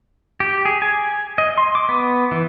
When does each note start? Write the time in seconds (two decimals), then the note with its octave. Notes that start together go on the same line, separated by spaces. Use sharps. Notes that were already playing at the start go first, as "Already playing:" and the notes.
0.40 G4
0.65 G#4
0.82 G#5
1.38 D#5
1.58 C6
1.75 D6
1.89 B3
2.31 E3